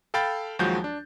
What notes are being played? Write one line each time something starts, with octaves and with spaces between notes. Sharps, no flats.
A4 F5 G5 B5 A6
D#2 F3 F#3 G#3 F#4 G6
D4